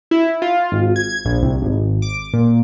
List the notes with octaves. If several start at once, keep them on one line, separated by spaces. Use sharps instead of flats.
E4
F4
G#1
G#6
A#1
C2
G#1
D6
A#2